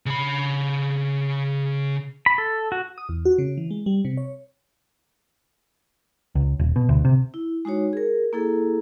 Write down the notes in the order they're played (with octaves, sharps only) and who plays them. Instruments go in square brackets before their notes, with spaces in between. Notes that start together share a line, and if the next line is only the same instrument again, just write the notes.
[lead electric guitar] C#3 B5
[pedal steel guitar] B5
A4
F#4
[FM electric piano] D#6
E2
F#4
C#3
E3
G#3
G3
C3
C#5
[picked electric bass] C#2
D#1
B2
D2
C3
[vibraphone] E4
G#3 D#4 F#4 C#5
G#4 A#4
A#3 E4 G#4 A4